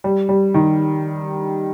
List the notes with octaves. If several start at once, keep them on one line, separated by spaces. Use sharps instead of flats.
G3
G3
D#3